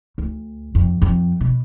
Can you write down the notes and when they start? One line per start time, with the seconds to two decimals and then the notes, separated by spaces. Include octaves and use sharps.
0.18 D2
0.75 F2
1.02 F2
1.41 B2